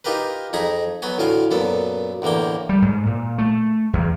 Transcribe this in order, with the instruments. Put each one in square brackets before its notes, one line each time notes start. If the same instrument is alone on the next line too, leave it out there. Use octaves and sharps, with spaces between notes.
[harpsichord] D#4 F4 G4 A#4 B4
F2 D#4 G#4 G#5 A#5 B5
F#3 B3 F#4 G#5
D2 A2 F4 F5 G#5
F#2 A#2 B3 A4
E2 A2 D3 A#3 G5
[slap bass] G3
G#2
A#2
A3
E2